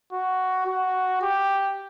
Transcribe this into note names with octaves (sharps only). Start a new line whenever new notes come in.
F#4
F#4
G4